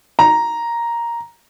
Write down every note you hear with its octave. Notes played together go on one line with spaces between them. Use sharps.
A#5